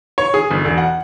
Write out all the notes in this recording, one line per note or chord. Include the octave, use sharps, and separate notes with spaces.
C#5
G#4
G1
E1
F#5